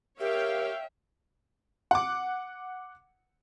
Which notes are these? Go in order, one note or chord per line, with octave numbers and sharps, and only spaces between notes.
G4 A#4 C#5 E5 F5 G5
F#5 D6